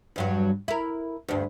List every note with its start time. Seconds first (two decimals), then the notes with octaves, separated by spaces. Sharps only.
0.16 E2 G2 F#3
0.68 E4 A#4
1.28 D2 G2